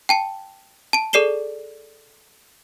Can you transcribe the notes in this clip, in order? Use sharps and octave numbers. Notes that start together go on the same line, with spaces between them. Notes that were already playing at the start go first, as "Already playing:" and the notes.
G5 A5 C#7
A5 D7
G#4 A4 D5 C7 E7 G7